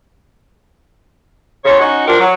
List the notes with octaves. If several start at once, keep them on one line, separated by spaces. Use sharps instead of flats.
E2 C#3 C5 C#5
C#4 D#4 F#4
F3 D4 F4 G4 A#4
F#3